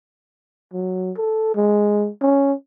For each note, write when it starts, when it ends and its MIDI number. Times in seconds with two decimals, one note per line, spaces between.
0.73 1.12 54
1.18 1.54 69
1.55 2.09 56
2.22 2.53 61